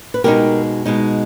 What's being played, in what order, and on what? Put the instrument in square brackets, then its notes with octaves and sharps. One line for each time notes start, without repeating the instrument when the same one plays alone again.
[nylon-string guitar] B4
B2 G#3 D#4 G4 A#4
B2 G#3 D#4